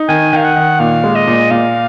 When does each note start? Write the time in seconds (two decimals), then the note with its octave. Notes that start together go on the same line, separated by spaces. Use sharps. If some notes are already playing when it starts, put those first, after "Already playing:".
Already playing: D#4
0.09 D#3 G#5
0.33 D#3 F5
0.45 F#5
0.56 D#3
0.80 A#2 F5
1.04 G#3
1.16 D#5
1.27 A#2
1.51 A#2 F5